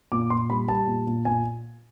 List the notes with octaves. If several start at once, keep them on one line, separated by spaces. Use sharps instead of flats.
A#2 D6
A#2 C6
G3 B5
G3 A5
A#2
A#2
A#2 G#5